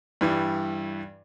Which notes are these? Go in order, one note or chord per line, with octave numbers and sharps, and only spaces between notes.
G2 E3 G3